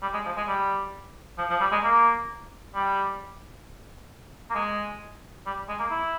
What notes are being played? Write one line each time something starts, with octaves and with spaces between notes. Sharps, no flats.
G3
G#3
F3
G#3
G3
F3
F3
G3
G#3
A#3
G3
A#3
G#3
G3
G#3
A#3
E4